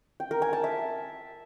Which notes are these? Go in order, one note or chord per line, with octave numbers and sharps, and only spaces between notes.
G5
A#4
G#5
A5
E5